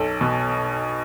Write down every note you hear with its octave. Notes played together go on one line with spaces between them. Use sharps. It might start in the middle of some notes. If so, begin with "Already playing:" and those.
Already playing: B1 A4
B2